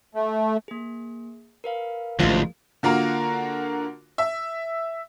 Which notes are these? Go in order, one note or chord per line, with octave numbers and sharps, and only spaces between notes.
A3
A#3 G#4
A#4 B4 F5
A1 D2 G#2 F3 D#4 F4
D3 A#3 F4 F#4 A#4
E5